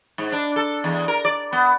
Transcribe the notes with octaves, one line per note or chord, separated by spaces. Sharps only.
G#2
D4
A4
E2
A#4
D5
B3